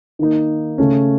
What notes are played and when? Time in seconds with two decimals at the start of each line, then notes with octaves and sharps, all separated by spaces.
0.19 D#3 A#3 D#4
0.78 C#3 A3 C#4